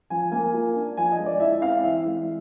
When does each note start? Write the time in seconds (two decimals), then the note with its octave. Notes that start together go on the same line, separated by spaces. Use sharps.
0.10 F3 G#5
0.32 A#3 G#5
0.54 F4
0.76 D4
0.97 F3 G#5
1.12 D#5
1.19 G#3
1.26 D5
1.40 E4 E5
1.62 C4 F5
1.84 E3 E5
2.06 G#3